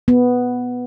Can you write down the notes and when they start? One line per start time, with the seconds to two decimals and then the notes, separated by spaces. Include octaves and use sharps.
0.08 B3